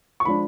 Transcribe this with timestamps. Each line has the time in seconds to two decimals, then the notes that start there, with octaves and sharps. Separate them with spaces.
0.20 C#6
0.25 F3 G#3 D4 B5